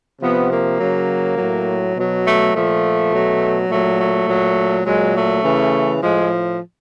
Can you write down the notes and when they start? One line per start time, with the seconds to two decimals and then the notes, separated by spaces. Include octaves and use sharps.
0.21 C3 F3 B3
0.50 A#3
0.80 C#3 F#3
1.37 A2 F#3
1.95 B2 F#3
2.25 A3
2.53 A#2 F3 A3
3.12 B2 F#3
3.69 A#2 F#3 A3
3.98 A3
4.27 A#2 F#3
4.85 A#2 F#3 G#3
5.14 A3
5.43 C#3 E3
6.02 A2 F3 G#3